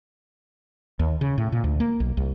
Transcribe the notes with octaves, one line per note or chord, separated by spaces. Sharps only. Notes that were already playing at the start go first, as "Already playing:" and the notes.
D#2
C#3
A2
A#2
D2
A#3
B1
C2